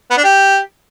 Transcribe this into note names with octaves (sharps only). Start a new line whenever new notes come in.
B3
D4
G4